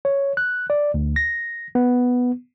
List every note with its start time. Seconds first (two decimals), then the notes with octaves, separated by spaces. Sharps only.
0.05 C#5
0.37 F#6
0.70 D5
0.94 D2
1.16 A#6
1.75 B3